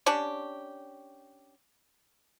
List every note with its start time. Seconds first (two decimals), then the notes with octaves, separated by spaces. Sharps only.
0.06 C#4 D4 G4